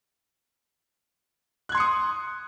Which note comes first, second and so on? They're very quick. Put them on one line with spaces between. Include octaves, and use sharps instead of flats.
F#6 G#6 C6 C#7 D#6